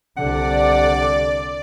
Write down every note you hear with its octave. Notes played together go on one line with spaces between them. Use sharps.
C2 D3 D5 F#5